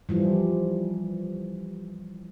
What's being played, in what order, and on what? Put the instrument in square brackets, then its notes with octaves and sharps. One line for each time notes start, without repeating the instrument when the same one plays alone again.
[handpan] E3 F3 G3